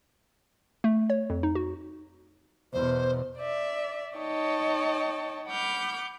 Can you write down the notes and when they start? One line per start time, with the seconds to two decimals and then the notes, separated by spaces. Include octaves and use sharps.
0.84 A3
1.10 C#5
1.30 F2
1.43 D#4
1.55 F#4
2.73 E2 B2 C5
3.37 D5 E5
4.17 D#4 C#5 D#5 G5 A5
5.47 F#5 B5 D6 F6 G6